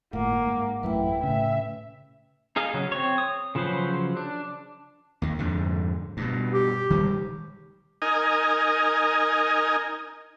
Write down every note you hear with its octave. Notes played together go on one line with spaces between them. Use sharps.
G1 A2 A#3 F#5
G#2
A1 F#2 A2 E4 B4 G5
A2 C#3 E5
D#4 G#4 D#5 F5
C#3 F#3
C4 C#5
D#6
C#3 F3 F#3 B4 C5
D4
D#2 D#3
F2 G#2 D3
G2 B2
G4
D#3 G3 G#3
D#4 A#4 D#5 G#5